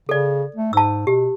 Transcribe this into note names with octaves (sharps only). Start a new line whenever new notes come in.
C#3 A4 D5
A3
G#2 A5 E6
B2 G4